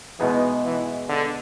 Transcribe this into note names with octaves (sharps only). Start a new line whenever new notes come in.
B2 E3 G#3 B3 D#4 G#4
E3
D3